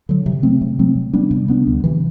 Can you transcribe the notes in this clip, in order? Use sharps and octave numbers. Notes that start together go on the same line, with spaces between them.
D3 F#3
C3
F#3 A3 C4
C3
F#3 A3 C4
C3
G3 B3 D4
C3
G3 B3 D4
D2
C3 E3